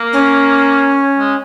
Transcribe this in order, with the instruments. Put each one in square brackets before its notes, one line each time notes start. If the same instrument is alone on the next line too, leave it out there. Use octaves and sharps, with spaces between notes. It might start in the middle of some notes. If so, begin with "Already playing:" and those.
Already playing: [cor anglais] A#3
[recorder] C#4
[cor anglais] G#3